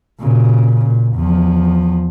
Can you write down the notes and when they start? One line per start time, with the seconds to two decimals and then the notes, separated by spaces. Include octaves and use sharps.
0.20 A#2 C#3
0.85 A#2
1.16 E2 F3